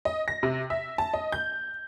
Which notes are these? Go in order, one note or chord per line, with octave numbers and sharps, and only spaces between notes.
D#5
A#6
C3
E5
A5
D#5
G6